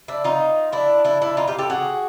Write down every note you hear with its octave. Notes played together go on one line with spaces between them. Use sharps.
D4 E4
D#4 F4
D4 E4
D4 E4
D4 E4
D#4 F4
F4 G4
G4 A4
F#4 G#4